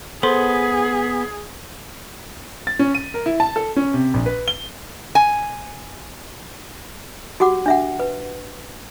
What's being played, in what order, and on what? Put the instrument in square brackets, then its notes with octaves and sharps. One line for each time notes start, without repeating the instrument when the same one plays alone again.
[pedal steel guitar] B3 [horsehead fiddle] G#4 [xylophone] A4 C5 C6
[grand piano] A6
C#4
D#7
A#4
E4
A5
A4
C#4
C3
A#1
B4
G7
[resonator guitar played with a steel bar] G#5
[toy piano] F#4 G4 F#5 D6
D4 E5 F#5
B4